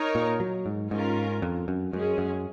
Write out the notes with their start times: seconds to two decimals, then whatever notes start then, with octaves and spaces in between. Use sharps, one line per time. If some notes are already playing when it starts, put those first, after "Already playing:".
Already playing: D#4 A#4 C#5
0.15 A#2
0.40 F#3
0.66 G#2
0.90 G#2 C#4 F4 A#4
1.42 F2
1.68 F#2
1.93 F#2 G#3 C#4 G#4
2.18 F#2